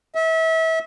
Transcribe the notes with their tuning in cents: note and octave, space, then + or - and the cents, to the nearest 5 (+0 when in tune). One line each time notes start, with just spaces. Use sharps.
E5 -30